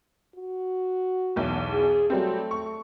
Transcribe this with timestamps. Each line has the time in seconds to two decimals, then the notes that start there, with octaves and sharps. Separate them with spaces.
0.35 F#4
1.36 B1 E2
1.73 G#4
2.10 F#3 G3 A3 C4
2.51 C#6